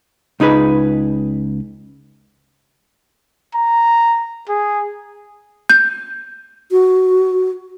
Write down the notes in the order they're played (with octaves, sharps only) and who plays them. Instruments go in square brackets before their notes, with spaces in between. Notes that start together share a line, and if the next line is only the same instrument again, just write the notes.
[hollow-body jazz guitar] C#2 D#4 G#4 B4
[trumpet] A#5
G#4
[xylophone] G6
[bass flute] F#4